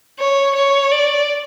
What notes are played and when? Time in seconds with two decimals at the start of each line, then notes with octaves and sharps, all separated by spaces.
0.19 C#5
0.56 C#5
0.92 D5